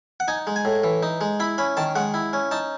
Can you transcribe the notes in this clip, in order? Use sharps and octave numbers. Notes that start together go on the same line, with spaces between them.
F#5
D#4 G#5
G#3
G#5
A2
E3
D#4
G#3
E4 B5
C#4 B5
D#3 A5
G#3 F#5
E4
C#4
D#4 A5